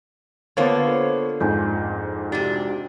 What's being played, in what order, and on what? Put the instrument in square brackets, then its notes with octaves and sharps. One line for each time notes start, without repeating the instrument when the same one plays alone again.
[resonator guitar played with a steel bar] D3 A#3 F4 [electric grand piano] B3 C#5 [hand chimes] C5 A5 D6
[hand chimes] A4
[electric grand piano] F2 G#2 [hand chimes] G#5 G6
[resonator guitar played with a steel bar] C3 D4 [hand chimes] F#4 G4